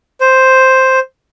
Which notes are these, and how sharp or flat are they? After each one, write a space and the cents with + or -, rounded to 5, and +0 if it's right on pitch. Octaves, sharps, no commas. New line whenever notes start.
C5 +0